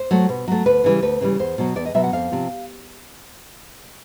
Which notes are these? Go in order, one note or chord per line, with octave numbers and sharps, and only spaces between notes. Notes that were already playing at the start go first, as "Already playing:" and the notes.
Already playing: C5
F#3 A3
B2
F#3 A3
D2 B4
C#3 E3 G3
D2 B4
C#3 E3 G3
E2 C5
B2 F#3
E2 D5
D#5
B2 F#3 E5
F#5
F2 F5
C3 F3